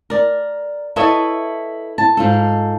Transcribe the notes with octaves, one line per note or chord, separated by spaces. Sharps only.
A#4 D5
E4 A4 B4 C#5 D#5 E5
A5
G#2 F4 A4